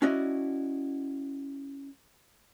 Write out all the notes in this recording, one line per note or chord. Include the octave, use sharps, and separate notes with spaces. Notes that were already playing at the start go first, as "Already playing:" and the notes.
C#4 E4 F#4 D5 D#5